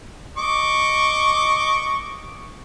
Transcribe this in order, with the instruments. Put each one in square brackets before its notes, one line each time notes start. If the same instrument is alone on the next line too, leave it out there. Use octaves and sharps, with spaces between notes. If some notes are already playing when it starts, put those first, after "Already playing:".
[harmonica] D#5 C#6 D6